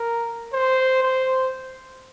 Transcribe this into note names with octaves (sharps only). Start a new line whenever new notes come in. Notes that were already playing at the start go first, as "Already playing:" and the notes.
Already playing: A#4
C5
C5